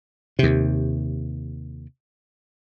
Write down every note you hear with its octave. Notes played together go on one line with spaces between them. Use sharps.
D#2 C3